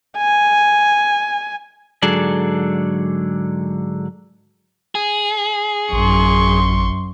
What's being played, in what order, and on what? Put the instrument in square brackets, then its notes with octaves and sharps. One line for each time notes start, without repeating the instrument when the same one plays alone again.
[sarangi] G#5
[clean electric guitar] G#2 D3 F#3 G#4 A4 D5
[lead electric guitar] G#4
[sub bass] A1 [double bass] F#2 [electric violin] C6 C#6